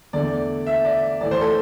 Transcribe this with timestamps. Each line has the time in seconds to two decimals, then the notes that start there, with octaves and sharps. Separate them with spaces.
0.13 E2 D3 A3 D5
0.66 E5
0.85 D5
1.21 A2 E3 A3 D5
1.31 C5
1.41 A4